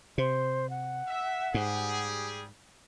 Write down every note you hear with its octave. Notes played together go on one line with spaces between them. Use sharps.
C3 C5
F#5
E5
G#2 G3 G4 G#4